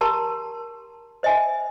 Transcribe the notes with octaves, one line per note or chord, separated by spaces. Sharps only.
G4 A#4 A5 A#5 C6
C5 D#5 E5 G#5